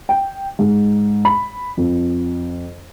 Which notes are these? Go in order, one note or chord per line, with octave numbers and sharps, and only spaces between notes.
G5
G#2
B5
F2